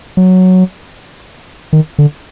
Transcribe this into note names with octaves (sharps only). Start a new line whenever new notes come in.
F#3
D#3
D3